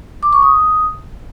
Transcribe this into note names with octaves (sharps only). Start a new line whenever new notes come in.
D6
C#6
D#6